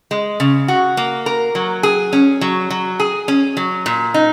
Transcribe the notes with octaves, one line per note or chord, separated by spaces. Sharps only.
G#3
C#3
F#4
A#3
A#4
F#3
G#4
C#4
F#3
F#3
G#4
C#4
F#3
A#2
D#4